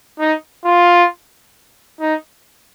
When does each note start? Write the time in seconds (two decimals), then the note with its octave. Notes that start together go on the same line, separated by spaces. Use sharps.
0.19 D#4
0.65 F4
2.00 D#4